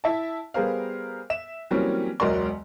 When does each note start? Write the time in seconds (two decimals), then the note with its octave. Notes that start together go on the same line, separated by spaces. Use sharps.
0.04 E4 E5 A5
0.54 G3 B3 G#4 A#4 C5 F5
1.30 E5 E7
1.71 E3 F#3 G3 A#3 C4 C#4
2.20 E1 C#2 F#3 A#4 D5 C6